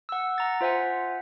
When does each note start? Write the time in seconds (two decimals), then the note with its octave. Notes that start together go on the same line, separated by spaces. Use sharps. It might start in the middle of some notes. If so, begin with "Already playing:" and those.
0.09 F#5 E6
0.38 F#5 A#5 A6
0.61 F4 C5 E5 F#5 G#5